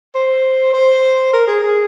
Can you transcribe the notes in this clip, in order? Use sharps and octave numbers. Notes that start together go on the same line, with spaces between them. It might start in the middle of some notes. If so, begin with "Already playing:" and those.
C5
C5
A#4
G#4
G#4